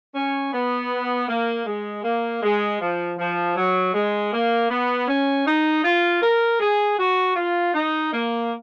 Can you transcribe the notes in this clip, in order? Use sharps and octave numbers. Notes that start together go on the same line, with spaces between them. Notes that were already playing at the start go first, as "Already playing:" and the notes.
C#4
B3
A#3
G#3
A#3
G#3
F3
F3
F#3
G#3
A#3
B3
C#4
D#4
F4
A#4
G#4
F#4
F4
D#4
A#3